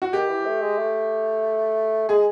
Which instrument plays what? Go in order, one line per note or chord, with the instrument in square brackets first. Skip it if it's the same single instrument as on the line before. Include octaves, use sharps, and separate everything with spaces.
[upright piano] F#4
[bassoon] D#3 [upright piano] G4
[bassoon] E3
A3
G#3
A3
[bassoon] G#3 [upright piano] G#4